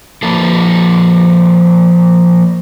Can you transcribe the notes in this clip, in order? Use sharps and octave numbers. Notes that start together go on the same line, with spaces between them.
F3 A#3 A4